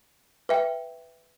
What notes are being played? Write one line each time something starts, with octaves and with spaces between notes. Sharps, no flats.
B4 E5 G5